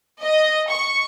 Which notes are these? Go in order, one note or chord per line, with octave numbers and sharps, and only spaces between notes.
D#5
C#6